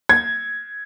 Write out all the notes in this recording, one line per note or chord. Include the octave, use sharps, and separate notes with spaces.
G#6